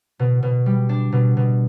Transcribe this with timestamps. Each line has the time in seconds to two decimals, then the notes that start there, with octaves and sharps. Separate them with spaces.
0.19 B2
0.43 B2
0.66 G3
0.89 D4
1.12 B2
1.37 B2